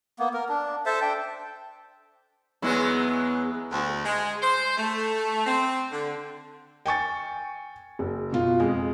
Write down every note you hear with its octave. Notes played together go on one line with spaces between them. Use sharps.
A#3 B3
A#4
D4
A4 C5 E5 A5
D4 G5
E2 F#3 G#3 B3 E4
D2
G#3
C5
A3
C4
D3
G5 G#5 C#6 A6
F#1
B2 F4
F2 G#3